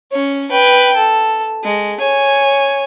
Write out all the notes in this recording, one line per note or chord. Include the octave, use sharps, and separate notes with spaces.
C#4 C#5
B4 G5
A4
G#3
C#5 G#5